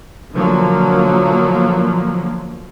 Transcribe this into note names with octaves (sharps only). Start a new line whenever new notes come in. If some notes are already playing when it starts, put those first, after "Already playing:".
B2 D3 F3 F#3 A#3